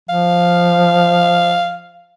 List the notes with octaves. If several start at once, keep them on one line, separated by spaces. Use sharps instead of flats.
F3 F5